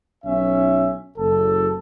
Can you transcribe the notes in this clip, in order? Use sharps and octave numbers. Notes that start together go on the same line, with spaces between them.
B1 C#4 E5
F#1 A4